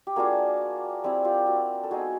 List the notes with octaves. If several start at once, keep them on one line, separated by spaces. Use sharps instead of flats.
G4
A#3 D4 F4 F#4 G#4
G3 C4 E4
F4 G4
F#4
A4
G#3 B3 D#4 F#4 G#4